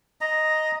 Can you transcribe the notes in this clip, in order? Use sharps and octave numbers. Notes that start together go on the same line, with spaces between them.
D#5 A#5